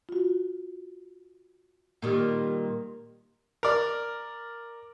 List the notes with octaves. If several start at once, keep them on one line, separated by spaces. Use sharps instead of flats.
F4 F#4
A#2 D#3 G3 A#3 G4
A#4 D5